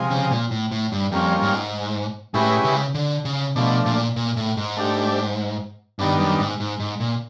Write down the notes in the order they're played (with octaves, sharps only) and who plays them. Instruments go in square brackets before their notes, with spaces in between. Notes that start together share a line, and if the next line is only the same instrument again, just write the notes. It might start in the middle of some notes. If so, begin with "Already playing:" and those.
Already playing: [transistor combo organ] C3 F3 G#3
[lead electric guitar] C#3
A#2
A2
A2
G2
[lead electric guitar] F2 [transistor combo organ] G3 A#3 C#4 F4
[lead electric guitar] G#2
[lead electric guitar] A2 [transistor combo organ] G#3 C#4 E4 G4 B4
[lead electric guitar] C#3
D3
C#3
[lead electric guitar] B2 [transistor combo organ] F3 A3 D4
[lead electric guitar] A#2
A#2
A2
G#2
[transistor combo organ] A3 D4 G4
[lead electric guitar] G2 [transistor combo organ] D#3 G3 B3 D4
[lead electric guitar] F#2
G#2
G#2
G#2
A#2